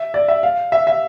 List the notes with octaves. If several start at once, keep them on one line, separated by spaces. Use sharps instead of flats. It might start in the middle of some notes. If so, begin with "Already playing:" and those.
Already playing: E5
D5
E5
F5
E5
E5